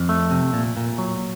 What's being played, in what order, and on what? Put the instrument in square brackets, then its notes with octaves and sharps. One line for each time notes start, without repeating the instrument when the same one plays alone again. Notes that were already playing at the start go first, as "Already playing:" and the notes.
Already playing: [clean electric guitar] F2
A3
C3
A#2
A#2
F#3